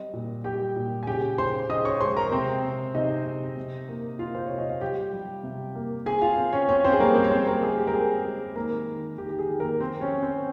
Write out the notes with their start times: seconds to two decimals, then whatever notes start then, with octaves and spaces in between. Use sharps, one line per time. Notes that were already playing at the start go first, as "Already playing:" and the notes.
Already playing: G3 C4 D#5
0.13 A#2
0.44 G3 G4 G5
0.76 A#2
1.03 G#5
1.07 C#3 G4 G5
1.38 C#3 C5 C6
1.70 C#3 D#5 D#6
1.85 C#5 C#6
2.00 G#3 C5 C6
2.16 A#4 A#5
2.32 C3 C4 C5
2.63 C3
2.95 C3 D#4 D#5
3.26 C3
3.57 C3
3.88 A#3
4.19 A#3 F4 F5
4.35 C5
4.46 C3 C#5
4.58 D#5
4.69 F5
4.81 G3 G4 G5
5.13 G3
5.43 C3
5.75 A#3
6.06 C4 G#4 G#5
6.22 F4 F5
6.37 C4
6.53 C#4 C#5
6.69 C4 C#4 C#5
6.84 C4 C5
6.93 G#4
7.00 G3 A#3 A#4
7.15 C4 C5
7.24 C#5
7.31 G#3 C4 C5
7.47 A#3 A#4
7.62 G#3 G#4
7.78 G4
7.87 A#4
7.93 C4 G#4
8.25 G#3
8.56 D#3 A#3 A#4
8.87 D#3
9.18 D#3 G4
9.29 G4
9.39 G#4
9.50 D#3
9.60 A#3 A#4
9.81 C4 C5
10.01 C#4 C#5
10.12 C4
10.23 C4 C5